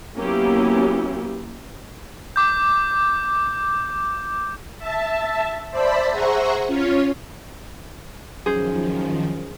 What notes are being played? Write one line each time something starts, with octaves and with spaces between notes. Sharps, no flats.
F#3 A#3 B3 C#4 E4 G4
D6 G6
E5 A5
C5 D5 E5 A5 B5 B6
G#4 C5 E5 F#5 A#5 C#6
C#4 F4 C#5
F#2 D#3 F3 G#4 C5